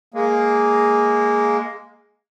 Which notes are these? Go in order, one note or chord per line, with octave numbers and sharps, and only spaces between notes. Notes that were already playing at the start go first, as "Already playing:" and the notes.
G#3 A#3